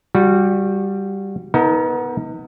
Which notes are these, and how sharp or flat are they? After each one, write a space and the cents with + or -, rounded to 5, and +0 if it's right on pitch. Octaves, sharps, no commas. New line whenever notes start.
G3 +0 F#4 -25
B3 -5 D#4 +35 A#4 -35